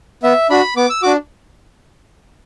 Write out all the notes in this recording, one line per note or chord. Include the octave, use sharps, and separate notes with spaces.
B3 E5
D4 F#4 B5
B3 D6
E6
D4 F#4 D6